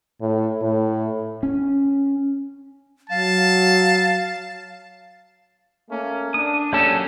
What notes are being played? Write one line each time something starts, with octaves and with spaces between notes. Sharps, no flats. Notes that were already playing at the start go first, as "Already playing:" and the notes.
A2
A2
C#4
F#3 F5 A5
A3 A#3 C#4
D4 D#6
F#3 A#3 C#4 G4 A4